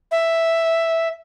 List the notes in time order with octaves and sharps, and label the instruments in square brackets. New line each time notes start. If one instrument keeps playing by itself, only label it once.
[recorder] E5